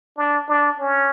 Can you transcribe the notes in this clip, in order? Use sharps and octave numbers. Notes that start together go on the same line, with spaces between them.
D4
D4
C#4